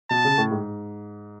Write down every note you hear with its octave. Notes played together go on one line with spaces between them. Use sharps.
B2 A5
C#3
A2
G#2